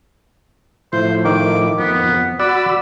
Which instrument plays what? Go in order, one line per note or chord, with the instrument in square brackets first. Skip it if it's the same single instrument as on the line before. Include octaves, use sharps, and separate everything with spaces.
[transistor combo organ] A2 F3 E4 [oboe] C5
[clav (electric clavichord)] D#3 [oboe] D6
[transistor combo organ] F2 [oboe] B3
[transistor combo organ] F#4 B5 E6 [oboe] D5 [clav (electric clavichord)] F#5